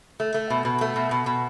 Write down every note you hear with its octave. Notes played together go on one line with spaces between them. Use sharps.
A3
A3
B2
B2
A3
B2
B2
B2